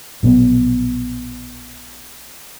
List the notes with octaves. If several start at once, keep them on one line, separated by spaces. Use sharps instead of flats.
A#1 B2 F#3 B3